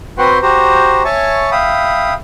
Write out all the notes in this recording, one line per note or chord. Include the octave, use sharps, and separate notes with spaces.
C4 F#4 B4 F#5 G5 C6
F#4 G4 C5 A#5
C#5 E5 G#5 A5 C#6
E5 F5 G5 B5 D#6